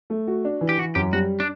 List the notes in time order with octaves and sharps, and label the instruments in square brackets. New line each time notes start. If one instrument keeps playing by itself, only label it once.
[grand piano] A3
F#4
D4
E3
[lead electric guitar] G4
[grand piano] E3 [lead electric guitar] F#4
[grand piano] F#2 [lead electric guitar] G4
[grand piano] G3 [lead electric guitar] F#4
[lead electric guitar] D4